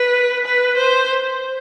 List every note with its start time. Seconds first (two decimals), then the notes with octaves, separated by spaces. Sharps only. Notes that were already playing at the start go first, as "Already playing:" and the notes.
Already playing: B4
0.44 B4
0.77 C5